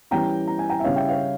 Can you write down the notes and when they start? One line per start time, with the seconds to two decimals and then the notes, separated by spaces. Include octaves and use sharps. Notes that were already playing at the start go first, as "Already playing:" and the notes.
0.11 E3 G3 C#4 G5 A#5
0.47 A#5
0.59 G#5
0.69 G5 A#5
0.80 E5
0.84 C#3 G3 C#4 C#5 F5
0.96 E5 G5
1.08 C#5 F5